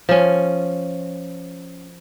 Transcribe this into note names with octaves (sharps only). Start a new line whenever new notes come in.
F3 C#4